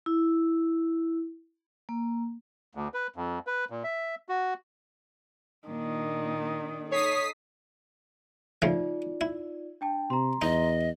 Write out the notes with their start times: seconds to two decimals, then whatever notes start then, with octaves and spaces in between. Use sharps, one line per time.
0.06 E4
1.89 A#3
2.75 D2
2.94 B4
3.16 F2
3.47 B4
3.70 A#2
3.84 E5
4.29 F#4
5.68 A#2 D#3 D4
6.92 D#4 A4 C#5 D#6 B6 C7
8.62 C#3 F3 A3 D#4 F4 D5
9.21 E4
9.81 D4 G5 A5
10.10 C3 A#5 C6
10.42 E2 D#4 D#5